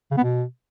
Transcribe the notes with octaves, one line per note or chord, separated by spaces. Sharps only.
C#3
B3
B2